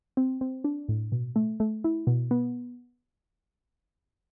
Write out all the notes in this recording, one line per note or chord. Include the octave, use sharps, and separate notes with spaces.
C4
C4
D4
A2
B2
A3
A3
E4
B2
B3